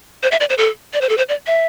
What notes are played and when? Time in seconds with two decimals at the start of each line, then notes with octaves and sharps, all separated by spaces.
0.23 C5
0.31 E5
0.40 D5
0.50 C5
0.58 A4
0.93 D5
1.01 C5
1.09 A4
1.17 C5
1.29 D5
1.47 E5